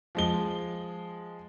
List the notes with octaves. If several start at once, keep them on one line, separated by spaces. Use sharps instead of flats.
F3 G#3 G7